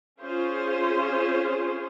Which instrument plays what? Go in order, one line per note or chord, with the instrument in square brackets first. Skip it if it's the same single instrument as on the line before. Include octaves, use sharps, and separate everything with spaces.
[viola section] C#4 F4 G#4 C5